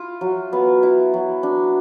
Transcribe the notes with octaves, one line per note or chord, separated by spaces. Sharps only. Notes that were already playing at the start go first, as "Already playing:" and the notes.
Already playing: E4 F4
F#3
B3
E4
F#3
D4